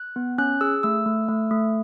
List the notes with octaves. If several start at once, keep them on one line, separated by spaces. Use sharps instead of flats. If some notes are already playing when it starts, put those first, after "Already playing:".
Already playing: F#6
B3
C#4 F#6
G#4 E6
A3 E6
A3
A3
A3